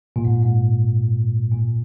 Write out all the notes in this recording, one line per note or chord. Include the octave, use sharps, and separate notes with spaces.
A#2
G#2
G#2
A#2